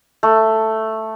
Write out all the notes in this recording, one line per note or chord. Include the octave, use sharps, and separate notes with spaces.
A3